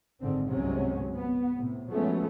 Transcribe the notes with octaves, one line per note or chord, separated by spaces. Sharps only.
G#1 G#2 D3 C4
G1 C2 C3 F#3 G#3 C#4
B3
A2 C3
F3 F#3 G#3 A3 B3 C#4